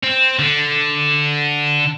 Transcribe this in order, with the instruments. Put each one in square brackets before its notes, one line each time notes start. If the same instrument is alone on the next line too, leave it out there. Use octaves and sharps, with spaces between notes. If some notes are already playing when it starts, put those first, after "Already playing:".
[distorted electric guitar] C4
D3